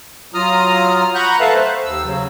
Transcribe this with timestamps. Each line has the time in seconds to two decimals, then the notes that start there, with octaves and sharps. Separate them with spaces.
0.34 F#3 F4 A#5 D#6 F6
1.15 F#5 A#5 B5 C#6 F#6 G6
1.40 A4 B4 E5 F5 A5
1.54 A3 C5
1.85 D#2 E6
2.04 C#3 F#3